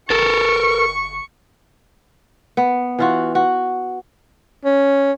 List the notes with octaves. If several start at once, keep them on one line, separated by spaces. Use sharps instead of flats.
G1 A4 A#4 C#6
B3
E3 F4 F#4
F#4
C#4